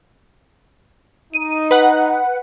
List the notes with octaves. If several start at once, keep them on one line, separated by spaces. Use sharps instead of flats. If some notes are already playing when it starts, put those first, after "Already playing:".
D#4 D#7
B4 F#5